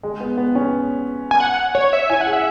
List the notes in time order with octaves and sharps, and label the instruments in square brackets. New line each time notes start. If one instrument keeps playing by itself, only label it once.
[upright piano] G#3
B3
B3
C#4
[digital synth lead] G#5
F#5
C#5
E5
[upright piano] E4 [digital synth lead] G#5
[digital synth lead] F#5
[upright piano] G#4
[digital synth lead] E5